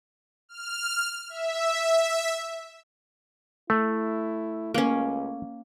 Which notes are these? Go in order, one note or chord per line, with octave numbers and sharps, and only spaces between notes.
F6
E5
A3 E4
C#2 A#3 C#4